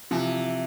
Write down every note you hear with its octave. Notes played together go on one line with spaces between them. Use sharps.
C3 E3 F3